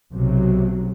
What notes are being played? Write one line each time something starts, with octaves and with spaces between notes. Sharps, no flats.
B1 C3 F#3